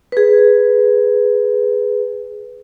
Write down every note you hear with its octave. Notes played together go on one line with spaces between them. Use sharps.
G#4 B4